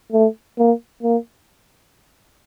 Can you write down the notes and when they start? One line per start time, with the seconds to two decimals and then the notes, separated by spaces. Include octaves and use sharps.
0.12 A3
0.58 A#3
1.03 A#3